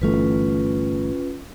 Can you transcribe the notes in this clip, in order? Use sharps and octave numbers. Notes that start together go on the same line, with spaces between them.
G1 E3 A3 C#4 F4 B4